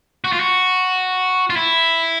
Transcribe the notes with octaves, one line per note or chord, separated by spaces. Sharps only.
F#4
F4
F#4
F4
E4